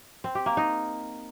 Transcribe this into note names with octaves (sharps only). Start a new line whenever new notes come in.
C4
G4
A#3
D#4